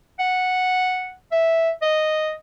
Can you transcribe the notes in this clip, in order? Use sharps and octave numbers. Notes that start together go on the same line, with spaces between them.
F#5
E5
D#5